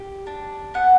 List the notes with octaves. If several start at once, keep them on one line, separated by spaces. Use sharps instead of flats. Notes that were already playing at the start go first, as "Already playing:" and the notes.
Already playing: G4
D4
B3 F#5